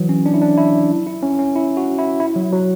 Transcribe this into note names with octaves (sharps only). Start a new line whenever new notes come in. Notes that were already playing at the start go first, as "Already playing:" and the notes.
Already playing: E3 F#3
C#4
D4
E4
D4
E4
E4
C#4
C#4
E4
F#4
E4
E4
F#3
F#3